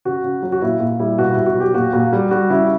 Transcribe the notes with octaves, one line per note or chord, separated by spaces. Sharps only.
C#3 F#4
C#3
F#3
F#4
A#2 E4
A#2
G3 E4
B2 F#4
E4
B2
F#4
F#3 G4
A#2 F#4
A#2
G3
G3 F#4
C#3 E4